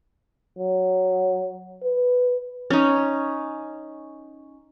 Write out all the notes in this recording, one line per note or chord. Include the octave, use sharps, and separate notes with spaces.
F#3
B4
C#4 D#4